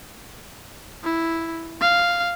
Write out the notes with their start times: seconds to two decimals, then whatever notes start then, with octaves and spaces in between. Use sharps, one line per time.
1.03 E4
1.81 F5